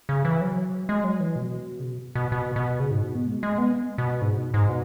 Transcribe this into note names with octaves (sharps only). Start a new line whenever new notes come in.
C#3
E3
F#3
G#3
F#3
E3
B2
C#3
B2
B2
B2
B2
C#3
G#2
B2
B3
G#3
G#3
B3
B2
G#2
B2
G#2
B2